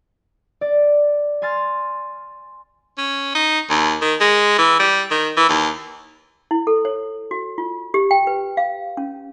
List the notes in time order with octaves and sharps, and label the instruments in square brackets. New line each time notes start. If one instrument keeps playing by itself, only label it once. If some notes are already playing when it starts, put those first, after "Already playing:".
[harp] D5
G#5 C6 F6 A6
[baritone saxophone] C#4
D#4
D#2
D#3
G#3
E3
G3
D#3
E3
D#2
[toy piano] E4
A4
C#5
F#4
F4
G4
G5
B4
F5
C#4